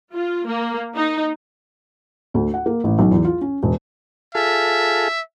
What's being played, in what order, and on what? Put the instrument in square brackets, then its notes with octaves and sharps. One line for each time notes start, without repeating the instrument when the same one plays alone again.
[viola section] F4
A#3
D#4
[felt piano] D2
F#5
A#3
A1
B1
E2
F4
C#4
E1
[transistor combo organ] F4 G#4 A4 [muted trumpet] E5